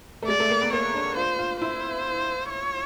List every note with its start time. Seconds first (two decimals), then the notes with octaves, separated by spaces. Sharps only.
0.23 A3
0.28 G#3 D5
0.40 A3
0.50 A#3
0.62 B3
0.73 A#3 C#5
0.94 D4
1.17 F4 C5
1.39 F4
1.61 E4 C5
2.49 C#5